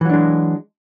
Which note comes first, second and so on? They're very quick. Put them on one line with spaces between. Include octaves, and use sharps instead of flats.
E3 F#3 D4 G#3